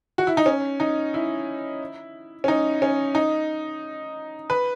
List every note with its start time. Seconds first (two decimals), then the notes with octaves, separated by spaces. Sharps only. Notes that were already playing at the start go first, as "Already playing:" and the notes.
0.18 F#4
0.27 E4
0.37 D#4
0.46 C#4
0.80 D#4
1.14 E4
2.44 C#4
2.48 D#4
2.82 C#4
3.15 D#4
4.50 B4